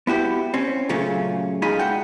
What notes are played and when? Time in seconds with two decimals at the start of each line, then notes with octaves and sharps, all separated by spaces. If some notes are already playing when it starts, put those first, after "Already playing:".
0.07 B3 E4 F#4 G4
0.54 C4 C#4
0.89 A#2 C#3 F#3 A3 C#4 F4
1.62 A#2 G#3 D#4 F4 G#4 B5
1.79 F#4 F#5 G5